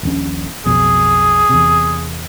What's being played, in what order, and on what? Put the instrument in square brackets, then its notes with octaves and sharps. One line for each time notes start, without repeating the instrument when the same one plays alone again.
[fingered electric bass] D#1 A#1 C#4
[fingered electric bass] B1 F2 B2 [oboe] G#4
[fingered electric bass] E2 C3